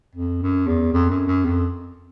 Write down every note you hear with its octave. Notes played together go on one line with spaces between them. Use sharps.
F2
F#2
E2
F2
F#2
F#2
F2